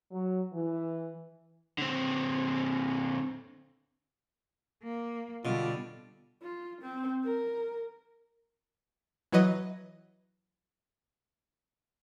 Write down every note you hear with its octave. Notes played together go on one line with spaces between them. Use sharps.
F#3
E3
D3 C4
A#3
B2 D3 G3 F4
F4
C4
A#4
E3 F#3 B4 D#5